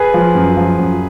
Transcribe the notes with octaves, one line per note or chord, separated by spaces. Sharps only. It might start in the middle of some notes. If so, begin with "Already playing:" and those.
Already playing: G#4 B4
F3
F#2
F3
F#2